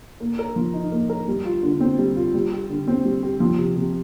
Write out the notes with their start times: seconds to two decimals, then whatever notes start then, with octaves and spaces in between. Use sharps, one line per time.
0.20 A#3
0.39 A#4
0.56 F3
0.74 D#4
0.92 A#3
1.10 A#4
1.28 G3
1.45 F4
1.63 D3
1.80 C4
1.98 G3
2.16 F4
2.34 G3
2.52 G4
2.70 D3
2.87 C4
3.05 G3
3.23 G4
3.40 F3
3.58 C3
3.76 C3